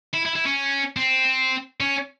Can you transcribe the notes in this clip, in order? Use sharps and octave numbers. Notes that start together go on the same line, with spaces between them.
E4
E4
E4
C#4
C4
C#4